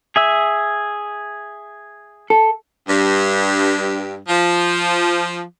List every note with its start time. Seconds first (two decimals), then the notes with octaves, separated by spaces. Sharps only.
0.16 G#4 E5 E6
2.30 A4
2.87 G2
4.27 F3